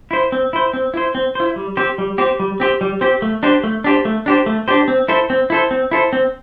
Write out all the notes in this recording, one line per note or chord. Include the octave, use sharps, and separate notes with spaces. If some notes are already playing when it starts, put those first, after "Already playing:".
E4 C5
C4
E4 C5
C4
E4 C5
C4
E4 C5
G3
C4 G4 C5
G3
C4 G4 C5
G3
C4 G4 C5
G3
C4 G4 C5
A3
D4 G4 C5
A3
D4 G4 C5
A3
D4 G4 C5
A3
D4 G4 C5
C4
E4 A4 C5
C4
E4 A4 C5
C4
E4 A4 C5
C4